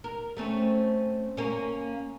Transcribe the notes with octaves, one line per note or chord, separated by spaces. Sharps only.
A#4
A3 C4 C#4
A#3 C#4